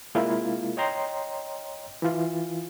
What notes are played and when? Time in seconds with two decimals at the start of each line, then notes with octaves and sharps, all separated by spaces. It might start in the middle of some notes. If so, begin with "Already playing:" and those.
0.15 C3 G#3 A#3 E4 F4
0.77 C#5 D#5 G5 A#5 C6
2.02 E3 F4